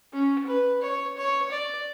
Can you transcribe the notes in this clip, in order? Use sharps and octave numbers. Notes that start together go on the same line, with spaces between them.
C#4
B4
C#5
C#5
D5